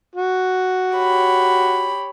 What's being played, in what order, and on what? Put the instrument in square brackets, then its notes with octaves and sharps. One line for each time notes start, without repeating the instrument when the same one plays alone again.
[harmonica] F#4
[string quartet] G4 C#5 B5